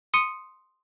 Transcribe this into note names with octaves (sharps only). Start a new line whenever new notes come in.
C6 D#6 C#7 D#7